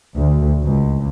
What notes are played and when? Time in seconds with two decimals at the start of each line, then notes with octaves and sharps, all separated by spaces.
0.16 D2
0.63 C#2